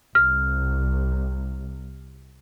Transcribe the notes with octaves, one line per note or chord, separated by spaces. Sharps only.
C2 F6